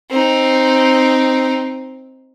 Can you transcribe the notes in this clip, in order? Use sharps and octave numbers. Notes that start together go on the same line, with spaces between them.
C4 D#4